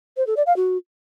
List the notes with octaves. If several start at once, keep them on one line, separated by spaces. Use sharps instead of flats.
C5
A4
D5
F5
F#4